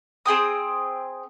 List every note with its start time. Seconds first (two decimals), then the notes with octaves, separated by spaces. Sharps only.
0.26 C4 G#4 G5 D#6